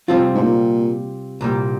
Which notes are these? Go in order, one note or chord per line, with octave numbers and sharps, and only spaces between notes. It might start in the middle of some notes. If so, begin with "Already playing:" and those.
C3 F3 G3 C4 F4
G#2
A#2
C2 A#2 G3